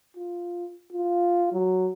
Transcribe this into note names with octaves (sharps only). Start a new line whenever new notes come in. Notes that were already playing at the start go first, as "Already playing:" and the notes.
F4
F4
F#3